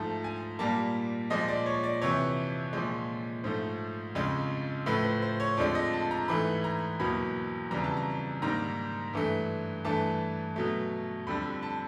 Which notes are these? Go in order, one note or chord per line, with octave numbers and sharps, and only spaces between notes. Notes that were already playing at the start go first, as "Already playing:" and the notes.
Already playing: G#2 F3 A3 A5
G#5
A#2 G3 A#3 A5
A#2 F3 G#3 D#5
D5
C#5
D5
F2 C3 E3 C#5
A#2 F3 G#3
G#2 F3 A3 C5
F2 C#3 F3 G#3
A2 F3 A3 B4
C5
C5
C#5
F2 D3 F3 G#3 D5
D#5
A5
A#5
G#2 E3 A3 B5
A#5
E2 B2 F#3 A#3 B5
F2 C#3 E3 G3 A#5
A5
A#5
G#2 D#3 G3 A#3 A#5
G2 E3 A3
G2 E3 A3 A5
B2 F#3 A3
F2 D3 G3 B5
A5